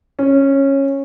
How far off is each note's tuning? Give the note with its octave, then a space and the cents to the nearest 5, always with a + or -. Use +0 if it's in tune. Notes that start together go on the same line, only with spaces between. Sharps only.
C#4 -15